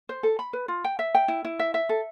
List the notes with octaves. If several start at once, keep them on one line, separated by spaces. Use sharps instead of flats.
C5
A4
B5
B4
F4
G5
E5
G5
E4
E4
E5
E5
A4